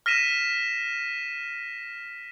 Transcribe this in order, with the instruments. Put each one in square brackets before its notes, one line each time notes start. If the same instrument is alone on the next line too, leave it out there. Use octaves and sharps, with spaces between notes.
[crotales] F6 A#6 B6 D#7 E7